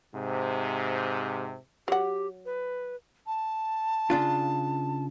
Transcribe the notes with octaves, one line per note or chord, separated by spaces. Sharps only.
G#2 C3
F#3 G4 F#5
B4
A5
C#3 D4 F4